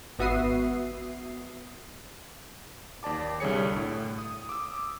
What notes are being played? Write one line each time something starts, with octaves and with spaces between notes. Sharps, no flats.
G#1 B3 F#4 E5 D#6 C7
D#2 D5 A5 D6
C2 D3 G3 G#4 C#5 C#7
A2
D#6
D6 E6